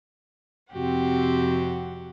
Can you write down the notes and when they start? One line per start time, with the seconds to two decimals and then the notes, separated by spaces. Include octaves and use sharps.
0.72 F2 C3 C4 F#4 G4 F#5